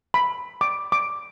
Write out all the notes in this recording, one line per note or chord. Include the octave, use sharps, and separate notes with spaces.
B5
D6
D6